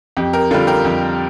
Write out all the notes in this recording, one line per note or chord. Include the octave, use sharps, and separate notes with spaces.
F2 G4
G4 A#4
D3 G3 F4 A4
G4 A#4
F2